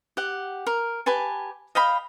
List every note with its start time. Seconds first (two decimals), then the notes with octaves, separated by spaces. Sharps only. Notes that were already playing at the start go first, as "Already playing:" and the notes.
0.17 G4 F#5
0.67 A#4
1.06 G4 B4 G#5 A5
1.75 D#5 F5 G5 B5